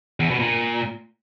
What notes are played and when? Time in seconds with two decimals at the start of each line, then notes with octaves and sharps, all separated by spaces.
0.20 E2
0.30 B2
0.40 A#2